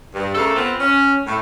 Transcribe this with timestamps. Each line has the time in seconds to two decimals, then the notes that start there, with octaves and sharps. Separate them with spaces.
0.15 G2
0.35 C#3 A3 A#3 A4
0.56 B3 C4 F4
0.80 C#4
1.27 A2 A3